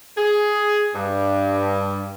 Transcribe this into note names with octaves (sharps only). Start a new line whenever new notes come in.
G#4
G2